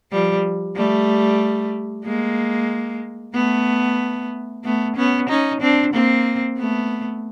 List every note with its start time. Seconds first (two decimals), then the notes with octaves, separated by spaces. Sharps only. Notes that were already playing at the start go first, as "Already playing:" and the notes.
0.12 F3 G3
0.76 G3 A3
2.05 G#3 A#3
3.34 A3 B3
4.64 A3 B3
4.96 B3 C#4
5.29 C#4 D#4
5.61 C4 D4
5.93 A#3 C4
6.58 A3 B3